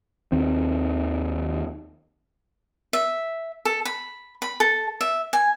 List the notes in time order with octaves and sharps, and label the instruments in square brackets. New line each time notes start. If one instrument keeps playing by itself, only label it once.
[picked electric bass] D#2 D#3 C4
[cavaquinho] E5
A4
B5
B5
A4
E5
G#5